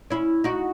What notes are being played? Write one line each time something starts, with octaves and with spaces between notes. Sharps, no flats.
C#4 E4
D#4 F#4